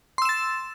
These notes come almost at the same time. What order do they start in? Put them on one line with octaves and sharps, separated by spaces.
C6 E6 E7 A6